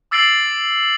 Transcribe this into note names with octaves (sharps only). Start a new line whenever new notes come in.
D6 E6 A6 C7 D7 F#7